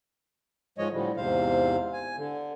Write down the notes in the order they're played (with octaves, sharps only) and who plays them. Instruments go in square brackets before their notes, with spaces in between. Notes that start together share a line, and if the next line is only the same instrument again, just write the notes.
[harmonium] G#2 F3 G#3 C#5 D#5
A2 D3 F3 G3
E2 G#2 C3 C5 F5
G#5
D3